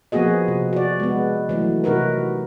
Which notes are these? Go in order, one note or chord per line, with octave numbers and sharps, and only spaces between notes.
F3 A#3 B3 F#4 G#4 D#5
C3
F#4 D5
G#3 B3
E3 F#3 A3
C3 D#4 F#4 A#4 B4